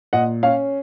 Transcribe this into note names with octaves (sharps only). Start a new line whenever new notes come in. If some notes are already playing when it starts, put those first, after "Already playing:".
A#2 D#5 F#5
C#4 C#5 F5